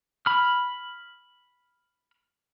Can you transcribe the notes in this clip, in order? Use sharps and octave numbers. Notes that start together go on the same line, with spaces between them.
B5 F6